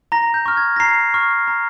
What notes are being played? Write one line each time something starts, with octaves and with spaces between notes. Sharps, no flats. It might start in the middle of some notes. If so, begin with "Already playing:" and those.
A#5 A#6
G6
C#6 F6
G#6
A#6
A#5 C7
C#6 F6
A#5